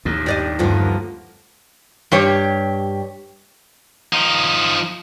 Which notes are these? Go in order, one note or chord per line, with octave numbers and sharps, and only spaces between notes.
D#2 A2
D4 G4 D5 D#5
D2 G2 D3 F3 B3 A#4
G2 G4 C#5
F3 D#4